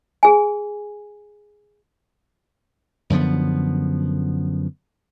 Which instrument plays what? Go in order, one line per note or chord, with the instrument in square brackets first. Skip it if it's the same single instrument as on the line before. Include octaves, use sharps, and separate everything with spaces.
[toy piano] G#4 G#5
[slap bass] F#2 D3 F3 B3